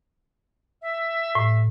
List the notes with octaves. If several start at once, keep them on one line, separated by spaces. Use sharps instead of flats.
E5
A2